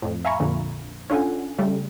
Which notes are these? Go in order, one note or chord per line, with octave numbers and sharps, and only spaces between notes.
F2 A2
E5 F5 G#5 A#5 B5 C#6
A#1 F2 A#2 D3
C#4 D4 F4 A4 F#5 G#5
C#3 G3 A3